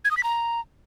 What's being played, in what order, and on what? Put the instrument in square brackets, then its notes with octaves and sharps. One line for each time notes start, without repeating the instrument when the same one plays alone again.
[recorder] G#6
D#6
B6
A#5